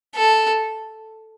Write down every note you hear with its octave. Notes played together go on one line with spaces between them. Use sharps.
A4